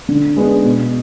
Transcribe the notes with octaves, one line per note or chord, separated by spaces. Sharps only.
D3
G#3 B3 D4
B2